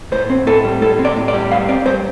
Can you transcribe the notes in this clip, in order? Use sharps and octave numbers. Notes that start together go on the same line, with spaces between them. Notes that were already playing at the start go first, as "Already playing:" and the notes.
A2 C5
C4
A2 A4
G3
A2 A4
C4
D5
A2
D5
G3
G2 F5
C4 D5
G2 C5